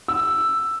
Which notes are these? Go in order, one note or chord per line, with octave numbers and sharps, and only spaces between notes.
E6